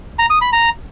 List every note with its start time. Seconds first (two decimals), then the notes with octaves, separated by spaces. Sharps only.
0.19 A#5
0.30 D#6
0.41 B5
0.53 A#5